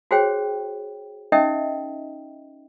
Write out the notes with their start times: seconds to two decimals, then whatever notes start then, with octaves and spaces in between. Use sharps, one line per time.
0.11 F#4 G#4 C5 C#5 G5
1.32 C#4 D#4 A#4 D#5 E5 G5